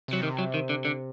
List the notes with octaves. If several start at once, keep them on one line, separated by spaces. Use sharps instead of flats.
C3 F#3
D#3
F#3
D#3
D3
D3